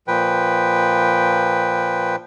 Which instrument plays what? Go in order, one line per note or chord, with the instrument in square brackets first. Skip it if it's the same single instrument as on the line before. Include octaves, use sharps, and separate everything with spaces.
[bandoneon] A#2 F3 B4 G5